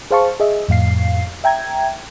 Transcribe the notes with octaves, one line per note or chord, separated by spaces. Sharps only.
G#4 C5 F5 A5 C#6
G#4 D#5 E5
F2 A2 F5 C7
E5 G5 A#5 G#6